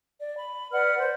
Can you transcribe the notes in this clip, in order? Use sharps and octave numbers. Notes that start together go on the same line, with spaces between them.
D5
B5
B4 D5 F#5 F6
C5 D5